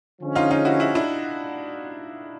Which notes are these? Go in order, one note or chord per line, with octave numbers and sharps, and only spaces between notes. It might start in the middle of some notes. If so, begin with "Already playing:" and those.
D3 F3 G#3 C#4
D#4 F4
D#4 F4
E4 F#4
E4 F#4
D4 E4